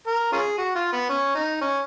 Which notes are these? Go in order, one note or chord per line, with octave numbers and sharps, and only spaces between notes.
A#4
C#4 F4 G#4
F#4
F4
B3
C#4
D#4
C#4